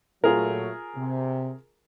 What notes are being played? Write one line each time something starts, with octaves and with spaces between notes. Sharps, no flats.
A#2 F#3 A3 F4 G#4 A#4
C3